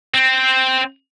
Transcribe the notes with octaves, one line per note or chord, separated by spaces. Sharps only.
C4